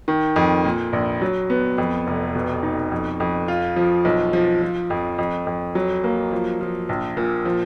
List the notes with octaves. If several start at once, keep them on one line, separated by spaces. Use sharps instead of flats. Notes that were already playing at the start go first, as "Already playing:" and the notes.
D#3
F2
A#2
A#1
F#3
B3
F2
F1
B2
D#4
F2
F2
F4
F3
B1
F3
F3
F2
F2
F2
F#3
A#3
F3
F3
A#1
A#2
F3